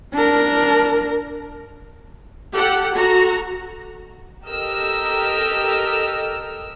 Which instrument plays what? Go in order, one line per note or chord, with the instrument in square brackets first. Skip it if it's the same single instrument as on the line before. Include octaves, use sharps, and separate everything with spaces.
[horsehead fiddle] D4 A#4
[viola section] G4 A4 F#5
F#4 A4 A#5
[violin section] G4 A4 A#4 D#5 E6 F6